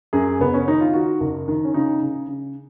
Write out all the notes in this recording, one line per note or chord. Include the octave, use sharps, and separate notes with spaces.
F#2 G#4
F#1 B3
C#4
D#3 D#4
F4
D#3 F#4
F#1
D#3
C#4
C#3 D#4
C#3
C#3